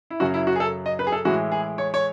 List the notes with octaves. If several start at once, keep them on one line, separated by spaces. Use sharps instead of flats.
E4
F#2 C#3 F#3 F#4
E4
F#4
G#4
A4
D#5
B4
G#4
A4
A2 E3 G#3 F#4
G#4
C#5
C#5